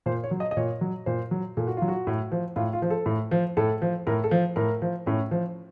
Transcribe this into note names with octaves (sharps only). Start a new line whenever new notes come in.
A#2 C5
C#5
F#3
D#5
D#5
A#2 C#5
F#3
A#2 C5
F#3
A#2 A4
F#4
F#3 F4
F#4
A2
F3
A2 F4
F4
F3
A4
A2
F3
A2 A4
F3
A2 A#4
A4
F3
A2 A#4
F3
A2 C#4
F3